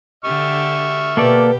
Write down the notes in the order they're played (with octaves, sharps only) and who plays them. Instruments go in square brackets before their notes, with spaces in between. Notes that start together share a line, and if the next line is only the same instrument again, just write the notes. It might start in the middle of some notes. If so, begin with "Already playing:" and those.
[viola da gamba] D3 G4 [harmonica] E5 C#6 F6
[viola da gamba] B2 G4 [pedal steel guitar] A#3 A4 D5 [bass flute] B4